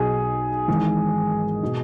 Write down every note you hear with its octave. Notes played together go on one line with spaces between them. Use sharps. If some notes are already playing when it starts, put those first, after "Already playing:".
Already playing: B1 B2 G#4
G#1 G#2 E3
B2